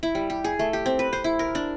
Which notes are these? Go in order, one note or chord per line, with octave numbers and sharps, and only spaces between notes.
E4
G3
G4
G#4
A3
G4
C4
B4
C5
E4
A#4
D4